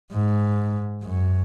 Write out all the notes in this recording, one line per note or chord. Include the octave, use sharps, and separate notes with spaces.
G#2
F#2